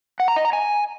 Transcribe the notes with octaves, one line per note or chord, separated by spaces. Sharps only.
F#5
A#5
D#5
A#5
G#5